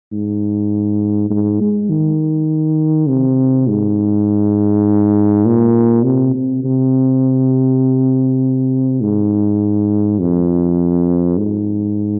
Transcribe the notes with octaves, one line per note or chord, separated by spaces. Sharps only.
G#2
G#2
G#3
D#3
C3
G#2
A#2
C3
C3
C3
G#2
F2
G#2